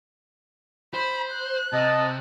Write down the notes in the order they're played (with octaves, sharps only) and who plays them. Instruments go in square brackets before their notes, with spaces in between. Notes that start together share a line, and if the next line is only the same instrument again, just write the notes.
[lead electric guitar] C5 [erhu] B5
[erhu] F#6
[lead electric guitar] C3 [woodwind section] D#5 A5